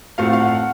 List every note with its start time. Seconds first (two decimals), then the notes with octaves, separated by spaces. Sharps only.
0.18 A2 A3 C4 F4 F5
0.25 F#5
0.33 F5
0.40 F#5
0.47 F5
0.55 F#5